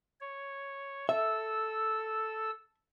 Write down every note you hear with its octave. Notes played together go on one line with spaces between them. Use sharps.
C#5
A4 E5 E6